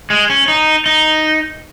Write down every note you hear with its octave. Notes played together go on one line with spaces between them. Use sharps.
G#3
C#4
D#4
D#4